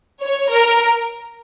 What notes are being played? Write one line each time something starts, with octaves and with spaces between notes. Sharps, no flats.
C#5
A#4